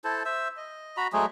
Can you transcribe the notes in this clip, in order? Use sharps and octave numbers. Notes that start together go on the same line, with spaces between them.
E4 A4 C5 A5
C5 E5 E6
D#5
F#4 A#5 B5
F#3 G#3 A3 G#4